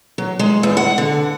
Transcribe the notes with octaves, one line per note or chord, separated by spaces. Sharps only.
F#3
G#3
E2
F#5
D3